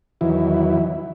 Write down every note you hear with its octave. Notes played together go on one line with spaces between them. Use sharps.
E2 D#3 E3 F#3 E4